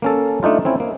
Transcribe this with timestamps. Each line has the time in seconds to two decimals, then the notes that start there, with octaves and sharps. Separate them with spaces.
0.02 A#3 C#4 A4
0.43 A3 D4 D#4 F4
0.65 C4 C#4 E4
0.80 A#3